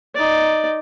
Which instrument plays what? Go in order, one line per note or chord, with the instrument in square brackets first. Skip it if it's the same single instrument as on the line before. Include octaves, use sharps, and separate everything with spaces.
[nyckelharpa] D#4 D5